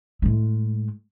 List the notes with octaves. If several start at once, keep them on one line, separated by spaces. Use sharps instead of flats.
A2 G#3